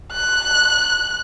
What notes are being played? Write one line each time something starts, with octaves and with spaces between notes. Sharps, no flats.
F#6